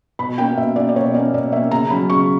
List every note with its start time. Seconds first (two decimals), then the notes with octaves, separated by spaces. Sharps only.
0.19 B2 B5
0.38 A#3 C#4 G5
0.57 B2 E5
0.76 A#3 C#4 D5
0.89 D5
0.96 B2 C#5
1.14 A#3 C#4 D5
1.33 B2 D5
1.52 A#3 E5
1.56 C#4
1.71 C#3 A#5
1.90 F#3 C#4 B5
2.10 C#3 C#6